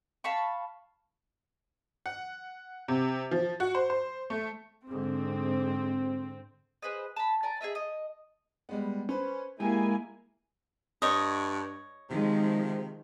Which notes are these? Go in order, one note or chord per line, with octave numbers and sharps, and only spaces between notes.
F5 A5 B5 C#6
F#5
C3
F3
F#4
C5
C5
A3
G#2 D3 C4
G#4 B4 C5 D#5
A5 B5
D5 G#5 A#5
G#4 C5 D#5 E5
D#5
G3 G#3 B3
C#4 B4 C5
G#3 A#3 E4 G4 G#5
G2 C#5 D#5
C3 D#3 F3 G#3